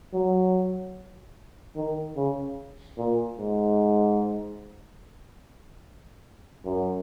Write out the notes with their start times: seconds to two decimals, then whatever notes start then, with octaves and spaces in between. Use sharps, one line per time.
0.14 F#3
1.76 D#3
2.16 C#3
2.98 A#2
3.38 G#2
6.65 F#2